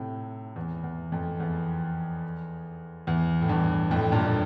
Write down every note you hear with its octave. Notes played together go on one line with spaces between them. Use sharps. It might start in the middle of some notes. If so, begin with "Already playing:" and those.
Already playing: A2 C3
E2
E2
F2
E2
E2
A2
E2 G2
F2 A2
G2 A#2